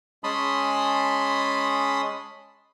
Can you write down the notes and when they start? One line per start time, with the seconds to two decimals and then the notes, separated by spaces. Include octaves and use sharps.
0.24 G#3 C#4 A5 B5 C6 D#6